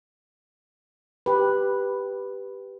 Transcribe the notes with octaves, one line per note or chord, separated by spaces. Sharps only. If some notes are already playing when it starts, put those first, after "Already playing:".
G4 B4